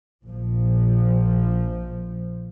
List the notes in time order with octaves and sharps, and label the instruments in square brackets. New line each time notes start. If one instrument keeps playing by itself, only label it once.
[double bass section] A#1 F3